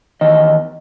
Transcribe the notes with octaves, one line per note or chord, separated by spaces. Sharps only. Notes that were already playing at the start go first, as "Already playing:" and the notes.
E2 D#3 D#5